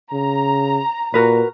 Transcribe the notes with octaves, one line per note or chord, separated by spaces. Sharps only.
C#3 A#5
A#2 F#4 A#4 B4